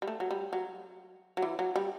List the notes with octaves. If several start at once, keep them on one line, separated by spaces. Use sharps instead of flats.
G3
A3
F#3
G3
F#3
F#3
E3
F#3
G3